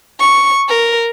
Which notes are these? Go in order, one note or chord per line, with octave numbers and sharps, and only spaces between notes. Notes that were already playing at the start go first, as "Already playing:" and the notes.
C#6
A#4